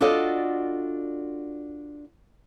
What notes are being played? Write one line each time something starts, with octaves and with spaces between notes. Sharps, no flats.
D4 F4 F#4 A4 D5 D#5